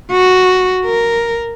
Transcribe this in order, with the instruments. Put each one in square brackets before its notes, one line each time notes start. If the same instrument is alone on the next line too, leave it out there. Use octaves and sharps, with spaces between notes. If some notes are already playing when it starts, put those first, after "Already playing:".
[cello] F#4
A#4